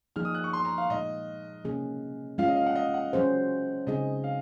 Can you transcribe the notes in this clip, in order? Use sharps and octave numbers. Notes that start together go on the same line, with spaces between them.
F3 A#3 D#4 G#4 F6
D#6
F#6
C#6
C6
A#5
F5
A#2 G#3 D#4 D#5
C3 F#3 A#3 C#4 G#4
G#3 C#4 F4 F5
D#5
F5
F#5
D#5
F#5
F#3 C#4 G#4 C5
C#3 G#3 C4 D#4 G#4 D#5
F5